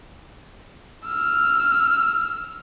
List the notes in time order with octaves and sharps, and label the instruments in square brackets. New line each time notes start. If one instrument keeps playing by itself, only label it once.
[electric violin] E6 F6